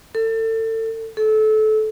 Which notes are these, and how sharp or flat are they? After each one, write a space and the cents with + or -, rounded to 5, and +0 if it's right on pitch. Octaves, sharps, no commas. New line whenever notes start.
A4 +30
A4 -25